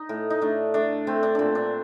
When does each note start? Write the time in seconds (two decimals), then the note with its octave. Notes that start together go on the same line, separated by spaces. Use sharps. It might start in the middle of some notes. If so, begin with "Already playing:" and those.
Already playing: D#4
0.09 A2
0.30 D#4
0.41 A3 D4
0.74 A3 D4
1.07 A3 C4
1.23 D4
1.35 A#2 C4 D4
1.55 D4